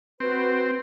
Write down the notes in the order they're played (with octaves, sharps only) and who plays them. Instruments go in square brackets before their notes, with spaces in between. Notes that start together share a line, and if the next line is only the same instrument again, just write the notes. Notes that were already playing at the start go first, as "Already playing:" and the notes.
[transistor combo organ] C4 [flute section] F#4 B4